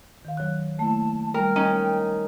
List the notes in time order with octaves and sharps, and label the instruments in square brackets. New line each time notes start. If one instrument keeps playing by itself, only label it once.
[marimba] D#3 F5
F#3 C#5 F#6
[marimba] A3 A#3 E4 [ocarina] A5
[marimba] G3 [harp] A#4 [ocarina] G5
[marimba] G3 [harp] C#4 D#4